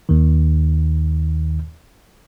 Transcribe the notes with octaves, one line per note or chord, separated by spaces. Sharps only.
D#2 D#3